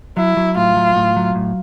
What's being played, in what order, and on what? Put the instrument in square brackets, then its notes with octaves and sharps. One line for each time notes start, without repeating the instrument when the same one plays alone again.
[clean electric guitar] F#3 [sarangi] E4
[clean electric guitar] F#3
[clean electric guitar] A2 [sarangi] F4
[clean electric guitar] F#3
A2
F#3
A2